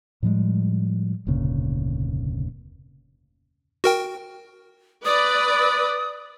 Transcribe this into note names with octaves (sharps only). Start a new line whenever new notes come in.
A2 F3 G3 G#3
F1 D2 A#2 C#3
F#4 A#4 G5
B4 D5 D#6